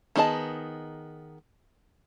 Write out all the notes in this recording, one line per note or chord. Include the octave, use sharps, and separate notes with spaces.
D#3 B3 G#4 D#5 A5